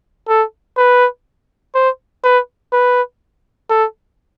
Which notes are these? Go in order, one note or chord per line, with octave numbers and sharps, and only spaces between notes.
A4
B4
C5
B4
B4
A4